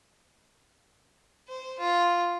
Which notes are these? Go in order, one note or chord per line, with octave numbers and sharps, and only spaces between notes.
C5
F4